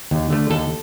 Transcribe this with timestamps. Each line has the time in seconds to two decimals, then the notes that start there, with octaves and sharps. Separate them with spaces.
0.11 D#2
0.30 D3 A3
0.50 D#2 A4